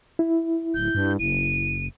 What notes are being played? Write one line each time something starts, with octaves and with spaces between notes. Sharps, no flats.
E4
D1 G6
G2
F#1 D#7